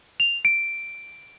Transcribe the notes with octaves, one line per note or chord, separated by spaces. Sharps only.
F7
D7